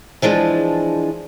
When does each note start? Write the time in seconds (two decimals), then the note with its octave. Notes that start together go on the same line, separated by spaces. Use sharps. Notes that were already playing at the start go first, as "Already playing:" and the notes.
0.22 E3 F3 G#3 D4